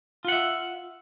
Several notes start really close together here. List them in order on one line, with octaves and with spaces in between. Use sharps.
F4 F#5 E5